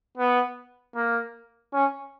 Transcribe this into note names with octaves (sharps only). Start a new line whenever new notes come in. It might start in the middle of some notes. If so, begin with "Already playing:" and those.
B3
A#3
C#4